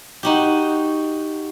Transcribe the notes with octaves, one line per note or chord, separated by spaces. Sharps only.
D#4 F#4 G4